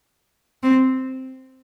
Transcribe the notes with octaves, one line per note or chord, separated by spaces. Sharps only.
C4